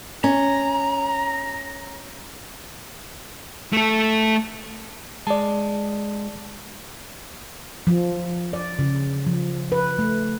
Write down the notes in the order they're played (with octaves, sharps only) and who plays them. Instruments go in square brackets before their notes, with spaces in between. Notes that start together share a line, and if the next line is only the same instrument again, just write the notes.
[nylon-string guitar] C#4 [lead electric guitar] A#5
[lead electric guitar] A3 A4
[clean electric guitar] G#3 [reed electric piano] D5 A5
[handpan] F3
D5
C#3
F3
B4
A3